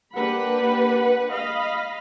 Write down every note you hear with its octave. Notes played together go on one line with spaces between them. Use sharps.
A#3 D4 G4 B4 F#5 B5
D#5 F5 B5